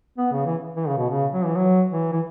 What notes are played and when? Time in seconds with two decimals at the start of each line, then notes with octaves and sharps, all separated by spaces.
0.18 B3
0.32 C#3
0.46 E3
0.76 E3
0.87 C#3
0.98 B2
1.09 C#3
1.33 F#3
1.45 E3
1.56 F#3
1.91 E3
2.13 E3